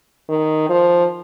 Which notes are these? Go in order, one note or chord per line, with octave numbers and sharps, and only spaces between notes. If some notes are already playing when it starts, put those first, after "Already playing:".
D#3
F3